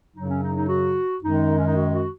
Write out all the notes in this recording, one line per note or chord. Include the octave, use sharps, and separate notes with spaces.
F#2 C#3 F#3 D#4
C#4
D#4
D#4
F#4
F#2 D#3 G#3 D#4
C#4
D#4
F#4
F#4